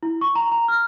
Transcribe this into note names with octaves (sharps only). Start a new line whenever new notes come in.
E4
C#6
A#5
A#5
F6